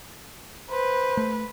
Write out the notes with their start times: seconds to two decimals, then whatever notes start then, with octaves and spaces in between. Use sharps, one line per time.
0.71 B4 C5
1.17 A3